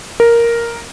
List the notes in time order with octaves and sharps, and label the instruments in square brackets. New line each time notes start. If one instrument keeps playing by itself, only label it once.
[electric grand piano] A#4